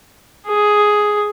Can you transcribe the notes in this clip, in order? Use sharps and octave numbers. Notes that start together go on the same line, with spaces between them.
G#4